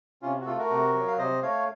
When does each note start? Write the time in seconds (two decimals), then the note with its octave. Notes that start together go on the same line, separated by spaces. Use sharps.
0.22 C3 C#4 F4
0.41 F#4
0.46 A3 F4 A4
0.58 F#4 A#4
0.70 C3
0.95 F#3
1.07 F5
1.18 C3 C5 D#5
1.43 A3 C#5 F5